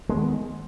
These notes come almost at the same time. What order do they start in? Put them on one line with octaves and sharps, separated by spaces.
G#3 A#3 D#3 B3